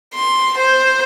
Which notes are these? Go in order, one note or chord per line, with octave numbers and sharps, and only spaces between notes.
C6
C5